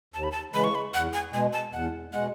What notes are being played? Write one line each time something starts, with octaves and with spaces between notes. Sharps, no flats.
D#2 A5
B5
A5
C#3 E3 G#3 B5
C#6
B5
E2 F#5
G#5
B2 G#3 G#5
A5
E2 F#5
B2 G#3 F#5